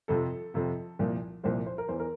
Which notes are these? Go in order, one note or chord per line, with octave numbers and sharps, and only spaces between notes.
F2 C3 F3 A4
F2 C3 F3
C2 A#2 F3
C2 A#2 F3 C5
C5
A#4
E2 E3 C5
A#4